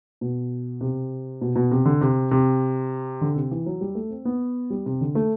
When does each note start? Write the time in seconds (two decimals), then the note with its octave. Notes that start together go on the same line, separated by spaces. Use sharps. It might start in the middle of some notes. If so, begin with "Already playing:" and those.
0.21 B2
0.81 C3
1.41 B2
1.56 B2
1.71 C3
1.86 D3
2.01 C3
2.31 C3
3.21 D3
3.36 C3
3.51 E3
3.66 F#3
3.81 G3
3.95 A3
4.10 C4
4.25 B3
4.70 G3
4.86 C3
5.01 D3
5.15 A3